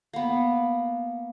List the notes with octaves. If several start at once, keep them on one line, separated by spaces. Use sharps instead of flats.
A#3 B3